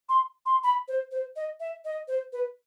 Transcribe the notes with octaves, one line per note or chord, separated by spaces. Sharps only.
C6
C6
B5
C5
C5
D#5
E5
D#5
C5
B4